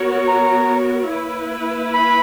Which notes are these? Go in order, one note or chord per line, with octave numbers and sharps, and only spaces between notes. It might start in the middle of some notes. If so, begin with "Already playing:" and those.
Already playing: B3 F#4 A#4 C#5
A#5
A#3 E4 B4
B5